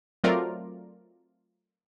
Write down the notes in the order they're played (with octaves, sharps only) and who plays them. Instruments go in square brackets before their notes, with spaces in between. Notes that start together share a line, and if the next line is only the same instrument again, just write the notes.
[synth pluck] F#3 A3 C4 F4 A#4 D5